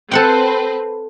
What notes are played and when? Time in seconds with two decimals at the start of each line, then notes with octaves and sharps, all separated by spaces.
0.11 C4 A4 B4 C5 F#5 G5